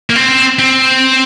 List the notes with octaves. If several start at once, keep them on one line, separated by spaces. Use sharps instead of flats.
A#3
C4
C4